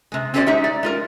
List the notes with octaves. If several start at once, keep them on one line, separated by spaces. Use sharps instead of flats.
C3 G#3
C4 C#4 F#4 A4 C5 D5
G#3 D#4 G4 E5
D5
G#3 F4 A#4